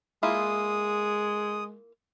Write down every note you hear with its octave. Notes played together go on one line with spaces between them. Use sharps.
G#3 A#3 E4 F4 D#6